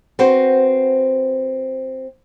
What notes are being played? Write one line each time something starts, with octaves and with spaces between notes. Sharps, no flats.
C4 F#4 B4 C5